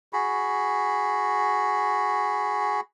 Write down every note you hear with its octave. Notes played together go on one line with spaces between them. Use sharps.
F#4 G#4 B5